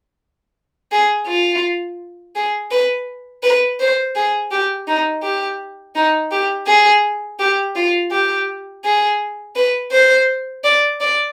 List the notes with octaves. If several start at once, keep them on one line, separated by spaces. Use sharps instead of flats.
G#4
F4
G#4
B4
B4
C5
G#4
G4
D#4
G4
D#4
G4
G#4
G4
F4
G4
G#4
B4
C5
D5
D5